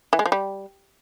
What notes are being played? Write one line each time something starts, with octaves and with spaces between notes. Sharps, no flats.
E3
G#3
F3
G3